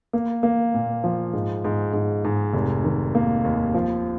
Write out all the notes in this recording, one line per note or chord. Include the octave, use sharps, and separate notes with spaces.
A#3
A#3
A#2
F3
G#2
G#2
G#2
G#2
F1
D#3
A#3
D#2
F3